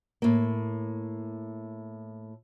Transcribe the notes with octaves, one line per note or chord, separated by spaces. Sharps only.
A2 A#3